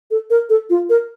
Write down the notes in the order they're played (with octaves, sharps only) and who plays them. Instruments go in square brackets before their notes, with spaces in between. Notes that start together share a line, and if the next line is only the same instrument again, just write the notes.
[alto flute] A4
A#4
A4
F4
A#4